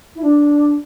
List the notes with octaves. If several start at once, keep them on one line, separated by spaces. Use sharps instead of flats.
E4
D4